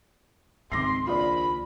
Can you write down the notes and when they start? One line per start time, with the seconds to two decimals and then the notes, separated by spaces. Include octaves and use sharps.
0.72 C#2 G#2 D#3 C4 C6 D6 A#6 C7
1.07 A#1 F4 D5 B5